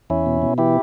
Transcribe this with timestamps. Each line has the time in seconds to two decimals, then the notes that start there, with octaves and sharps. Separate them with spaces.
0.10 E2 C#4 E4
0.26 B2
0.42 B2
0.58 E3 E4 G4